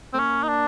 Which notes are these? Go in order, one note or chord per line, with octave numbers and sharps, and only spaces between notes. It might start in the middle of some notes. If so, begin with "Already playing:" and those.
A3 C4
A#3 C#4
D#4
D4